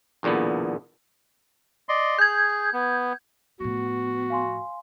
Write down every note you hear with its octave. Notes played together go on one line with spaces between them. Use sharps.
B1 E2 A#2 D3 B3
D5 D#5 C6
G#4 G6 G#6
B3
A2 F3 B3 F#4
F5 G#5 C6